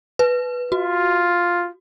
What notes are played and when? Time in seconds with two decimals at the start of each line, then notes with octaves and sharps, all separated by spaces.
0.19 B4
0.72 F4 F#4